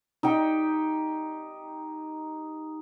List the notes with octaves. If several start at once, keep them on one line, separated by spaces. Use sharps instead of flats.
D#4 G4 G5